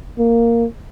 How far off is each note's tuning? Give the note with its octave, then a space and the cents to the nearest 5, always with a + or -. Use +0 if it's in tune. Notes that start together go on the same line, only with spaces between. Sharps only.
A#3 -5